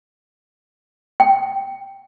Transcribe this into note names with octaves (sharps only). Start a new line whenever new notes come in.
G5